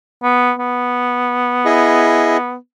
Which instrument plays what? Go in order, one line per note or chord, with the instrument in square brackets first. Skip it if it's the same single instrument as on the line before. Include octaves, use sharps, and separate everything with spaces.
[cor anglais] B3
B3
[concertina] E4 G#4 D#5